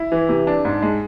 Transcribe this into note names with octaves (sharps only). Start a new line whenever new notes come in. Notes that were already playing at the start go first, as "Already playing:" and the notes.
Already playing: E4
E3
C3
D4
G#2
G#3